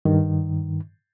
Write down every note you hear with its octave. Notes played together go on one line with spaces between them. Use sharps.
G2 D#3